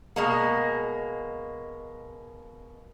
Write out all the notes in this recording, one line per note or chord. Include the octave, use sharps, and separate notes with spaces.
B2 G#3 A#3